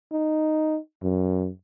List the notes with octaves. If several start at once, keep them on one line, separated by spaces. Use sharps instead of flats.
D#4
F#2